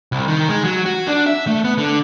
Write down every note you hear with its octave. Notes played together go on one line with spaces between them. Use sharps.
C2
D#3
G#3
F#3
F#4
D4
E5
A3
B3
D3